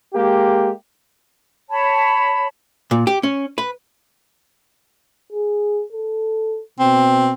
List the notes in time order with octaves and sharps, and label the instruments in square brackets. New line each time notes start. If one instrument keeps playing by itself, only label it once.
[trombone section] G#3 A#3 G4
[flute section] C#5 A5 B5
[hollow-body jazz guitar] A#2
G4
C#4
B4
[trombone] G#4
A4
[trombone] B2 [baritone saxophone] C4